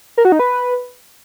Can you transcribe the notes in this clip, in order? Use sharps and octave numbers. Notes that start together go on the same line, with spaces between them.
A#4
F#4
D#4
B4